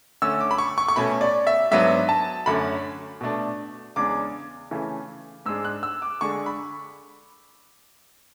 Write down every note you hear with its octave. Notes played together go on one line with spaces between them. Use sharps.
D3 A3 C#4 E6
D6
B5
C#6
C#6
C#6
B2 A3 C#4 B5
D5
E5
G#2 F#3 B3 D4 E5
A5
F#2 D3 A3 C#4 B5
B2 A3 D4
E2 C#3 G#3 D4 D6
C#3 E3 A3
G#2 G#3 D4 E6
F#6
E6
D6
D3 G#3 D4 C#6
B5